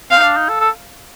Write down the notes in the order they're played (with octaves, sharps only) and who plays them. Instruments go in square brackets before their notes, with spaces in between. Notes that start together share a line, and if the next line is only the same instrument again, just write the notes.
[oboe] C4 [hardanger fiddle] F5
[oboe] D#4
D4
D#4
A4
A4